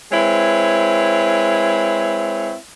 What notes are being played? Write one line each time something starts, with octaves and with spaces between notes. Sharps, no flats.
G#3 C4 E4 B4 C#5